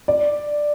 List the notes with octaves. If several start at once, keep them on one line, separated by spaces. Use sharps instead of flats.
D5